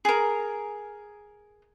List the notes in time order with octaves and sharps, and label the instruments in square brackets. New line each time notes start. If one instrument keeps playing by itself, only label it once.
[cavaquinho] G#4 A#4